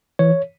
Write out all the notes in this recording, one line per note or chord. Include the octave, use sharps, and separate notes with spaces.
E3 C#5